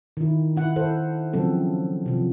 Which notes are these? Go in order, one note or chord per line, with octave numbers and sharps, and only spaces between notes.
D#3 E4
E4 F#5
E4 A4 C5
C#3 F3 F#3 C4 A4
C3 F3